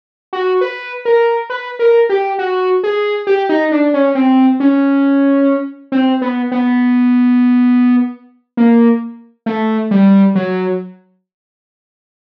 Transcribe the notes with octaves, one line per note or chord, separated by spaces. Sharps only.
F#4
B4
A#4
B4
A#4
G4
F#4
G#4
G4
D#4
D4
C#4
C4
C#4
C4
B3
B3
A#3
A3
G3
F#3